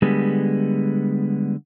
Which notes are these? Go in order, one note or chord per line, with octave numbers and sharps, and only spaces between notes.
D3 G3 G#3 B3